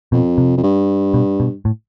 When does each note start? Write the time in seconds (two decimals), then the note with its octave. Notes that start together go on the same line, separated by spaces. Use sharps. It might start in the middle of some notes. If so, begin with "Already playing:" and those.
0.12 F2 B2
0.38 C3
0.57 F2
0.63 G2
1.14 B2
1.40 B2
1.65 A2